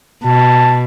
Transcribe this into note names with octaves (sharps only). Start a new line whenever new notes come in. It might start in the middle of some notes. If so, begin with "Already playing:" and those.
B2 A5